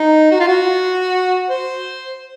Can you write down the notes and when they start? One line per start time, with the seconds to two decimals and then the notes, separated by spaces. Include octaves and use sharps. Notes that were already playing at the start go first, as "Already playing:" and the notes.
Already playing: D#4
0.32 F#4
0.40 F4
0.48 F#4
1.50 C5